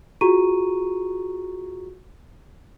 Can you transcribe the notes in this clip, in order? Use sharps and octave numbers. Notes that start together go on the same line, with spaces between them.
F4 F#4 G#4 A#5 C#6 D#7